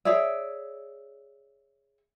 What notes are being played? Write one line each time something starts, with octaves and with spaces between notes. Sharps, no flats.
G#4 C#5 D5 E5